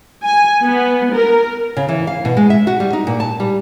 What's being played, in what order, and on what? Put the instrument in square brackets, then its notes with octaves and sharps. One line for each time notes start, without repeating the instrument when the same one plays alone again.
[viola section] G#5
B3
A#4
[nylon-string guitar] C#3
E3
F5
B2
G#3
E5
F#4
G3
D#4
A#2
A5
G3